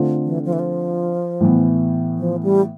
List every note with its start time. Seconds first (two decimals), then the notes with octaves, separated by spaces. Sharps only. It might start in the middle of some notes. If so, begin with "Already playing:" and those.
Already playing: D3 A3 C4 F4
0.25 E3
0.45 F3
0.53 E3
0.59 F3
1.40 A2 E3 B3
2.18 F3
2.43 G3